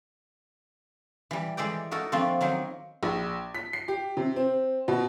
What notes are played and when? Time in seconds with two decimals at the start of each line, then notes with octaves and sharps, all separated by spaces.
1.31 E3 G3
1.57 E3 G#3 A4 D5 G5
1.91 D#4 F#4 A4 A#4
2.12 F3 A3 A#3 C4 D4
2.41 D#3 F#3 A#3 C4 D#4
3.03 A#1
3.55 B6
3.73 C7
3.88 G4
4.17 C3
4.36 C4
4.88 B2